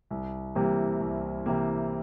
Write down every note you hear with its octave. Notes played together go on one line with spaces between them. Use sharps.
C2
C3 E3 G3 A#3
C2
C3 E3 G3 A#3